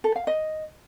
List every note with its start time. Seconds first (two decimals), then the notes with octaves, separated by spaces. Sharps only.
0.04 A4
0.16 F5
0.27 D#5